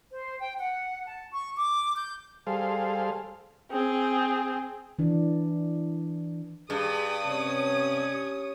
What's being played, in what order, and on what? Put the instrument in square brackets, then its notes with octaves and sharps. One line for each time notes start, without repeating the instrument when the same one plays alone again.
[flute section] C5
G5
F#5
A5
C#6
D6
G6
[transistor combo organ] G3 G#4 A4 C5 F5
[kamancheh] C4 G#4
[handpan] E3 D4
[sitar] G2 [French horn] G#4 [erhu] D#6
[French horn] C3 [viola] C#4 C#5